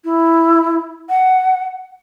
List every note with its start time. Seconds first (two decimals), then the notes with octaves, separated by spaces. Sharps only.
0.05 E4
1.09 F#5